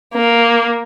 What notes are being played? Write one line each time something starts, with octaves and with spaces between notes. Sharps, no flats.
A#3